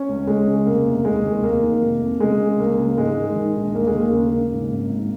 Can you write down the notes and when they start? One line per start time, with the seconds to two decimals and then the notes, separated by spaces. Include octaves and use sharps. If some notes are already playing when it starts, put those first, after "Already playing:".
Already playing: C#4
0.09 C#2
0.27 C#2 G#3
0.47 C#3
0.66 F1 A#3
0.86 F1
1.05 D#2 G#3
1.25 D#2
1.43 F1 A#3
1.63 D#3
1.82 F1
2.01 F2
2.20 C#3 G#3
2.40 C#3
2.59 C#2 A#3
2.79 C#3
2.97 G#2 G#3
3.17 D#3
3.36 D#3
3.56 A#1
3.74 D#2 A#3
3.87 G#3
3.94 D#2
4.00 A#3
4.13 C#3
4.33 C#3
4.51 G#2
4.71 G#1
4.90 G#2